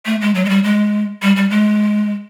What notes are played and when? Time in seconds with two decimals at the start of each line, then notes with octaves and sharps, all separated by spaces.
0.06 A3
0.21 G#3
0.35 F#3
0.45 G#3
0.50 G3
0.64 G#3
1.22 G3
1.36 G3
1.50 G#3